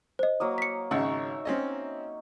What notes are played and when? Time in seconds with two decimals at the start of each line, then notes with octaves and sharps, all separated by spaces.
0.19 C5 D#5
0.40 F#3 A#3 D#6
0.58 B6 C#7
0.91 G#1 C#3 D#4 E5 F#5 C#6
1.45 C4 C#4 D#5